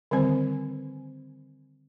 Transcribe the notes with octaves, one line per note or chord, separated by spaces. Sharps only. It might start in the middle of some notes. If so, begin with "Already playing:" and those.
D3 D#3 G3 C4 C5